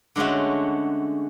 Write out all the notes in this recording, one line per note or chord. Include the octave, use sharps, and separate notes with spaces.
D3 G#3 A3 C#4 F#4